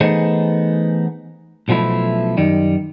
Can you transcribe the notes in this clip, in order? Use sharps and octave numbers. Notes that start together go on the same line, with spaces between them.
E3 A3 B3 D#4 G#4 C5
B1 B2 F3 A3 E4
F#2 D#3 G3